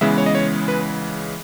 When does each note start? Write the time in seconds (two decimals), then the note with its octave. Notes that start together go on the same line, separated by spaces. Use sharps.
0.01 C#3 E3 G#3 B3 E5
0.18 C#5
0.26 D#5
0.35 C#5
0.68 B4